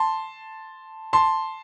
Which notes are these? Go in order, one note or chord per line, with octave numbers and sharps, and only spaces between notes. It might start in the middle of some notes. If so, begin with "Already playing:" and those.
Already playing: A5 C6
A5 C6